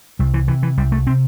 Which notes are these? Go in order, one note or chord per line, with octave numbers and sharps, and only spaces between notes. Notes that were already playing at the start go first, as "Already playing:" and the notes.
C2 G3
E3
C3 E3
E3
C2 G3
A3
C3 C4